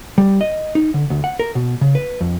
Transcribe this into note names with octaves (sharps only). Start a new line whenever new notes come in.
G3
D#5
D#4
D3
D2
F#5
A#4
B2
C#3
B4
F2